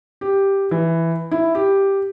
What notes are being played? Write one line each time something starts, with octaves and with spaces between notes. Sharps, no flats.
G4
E3
E4
G4